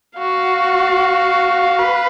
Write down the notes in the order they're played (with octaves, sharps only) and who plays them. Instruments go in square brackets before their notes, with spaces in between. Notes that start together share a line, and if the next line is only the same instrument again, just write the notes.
[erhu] F#4 [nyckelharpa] F5
[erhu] B4